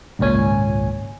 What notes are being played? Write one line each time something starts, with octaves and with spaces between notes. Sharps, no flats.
G#1 C#2 A#2 C#4 G#5